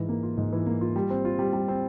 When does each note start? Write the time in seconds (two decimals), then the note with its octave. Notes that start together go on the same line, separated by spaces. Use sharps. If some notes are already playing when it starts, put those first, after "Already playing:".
Already playing: G#2 E3
0.09 A#3
0.23 F4
0.37 G#2
0.53 E3
0.66 A#3
0.81 F4
0.96 G3
1.10 C4
1.25 F4
1.39 G3
1.53 G3
1.68 C4